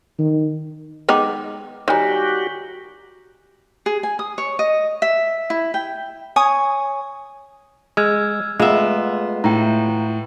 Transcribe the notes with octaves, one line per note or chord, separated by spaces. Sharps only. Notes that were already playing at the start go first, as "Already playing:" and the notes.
D#3
G#3 B3 D#4 G5 D6
D#3 G3 F#4 G4 C#5 G#5 A#5
G#4
G#5
D#6
C#5
D#5
E5
E4
G5
C#5 G#5 D#6
G#3 E6 F6 G#6
G#3 A3 B3 F4 E5
A2 G5 A#5